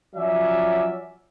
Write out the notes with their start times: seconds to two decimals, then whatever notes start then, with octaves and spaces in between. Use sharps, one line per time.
0.15 F3 F#3 C#4 D5 E5